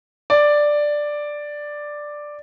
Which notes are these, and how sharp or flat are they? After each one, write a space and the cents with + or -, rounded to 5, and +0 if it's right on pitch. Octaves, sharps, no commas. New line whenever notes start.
D5 +5